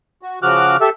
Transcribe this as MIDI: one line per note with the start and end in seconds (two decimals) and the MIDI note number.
0.22 0.39 66
0.42 0.77 49
0.42 0.77 53
0.42 0.77 66
0.42 0.77 86
0.42 0.77 89
0.42 0.77 90
0.81 0.89 67
0.81 0.89 69
0.81 0.89 76
0.81 0.89 88